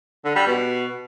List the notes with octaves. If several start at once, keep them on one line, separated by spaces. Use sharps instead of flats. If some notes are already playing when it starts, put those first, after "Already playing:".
D3
G3
B2